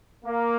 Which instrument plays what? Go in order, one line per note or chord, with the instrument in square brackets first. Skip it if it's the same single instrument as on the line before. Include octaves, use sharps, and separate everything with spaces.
[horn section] A#3